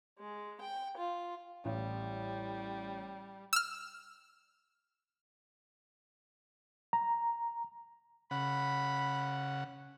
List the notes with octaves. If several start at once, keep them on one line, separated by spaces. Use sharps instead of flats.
G#3
G5
F4
A1 G3
E6 F6
A#5
C#3 F#5 B5